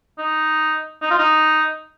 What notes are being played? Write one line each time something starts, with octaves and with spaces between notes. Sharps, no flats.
D#4
D#4
F4
D#4